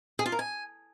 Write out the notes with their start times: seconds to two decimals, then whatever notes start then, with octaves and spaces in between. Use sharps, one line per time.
0.19 G#4
0.26 F4
0.32 A#4
0.39 G#5